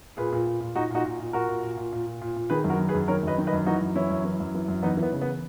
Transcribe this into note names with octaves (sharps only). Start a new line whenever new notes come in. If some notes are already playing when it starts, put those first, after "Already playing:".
A#2 G#4 B4
A#2
A#2
A#2
A#2 D#4 F#4
A#2 D#4 F#4
A#2
A#2
A#2 F#4 A#4
A#2
A#2
A#2
A#2
A#2
A#2
A#2
D#3 G#4 B4
F#2
F#4 A#4
D#3
G#4 B4
F#2
D#3 A#4 C#5
F#2 B4 D#5
D#3
B4 D#5
F#2
E3 D#4 F#4
F#2
E3 C#4 E4
F#2
E3
F#2
E3
F#2
E2 B3 D#4
E3
B3
C#3
B3